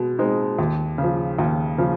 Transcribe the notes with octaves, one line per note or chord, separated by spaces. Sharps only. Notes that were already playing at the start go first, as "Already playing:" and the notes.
Already playing: B2 G#3
G#3 C4 D#4
D#2
C#3
F3
D#2
C#3 F3